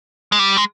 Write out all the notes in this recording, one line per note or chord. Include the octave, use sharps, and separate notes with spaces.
G#3
G3
G#3